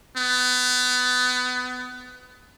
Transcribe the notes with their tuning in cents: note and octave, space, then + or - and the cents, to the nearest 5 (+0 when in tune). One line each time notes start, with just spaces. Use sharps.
B3 +25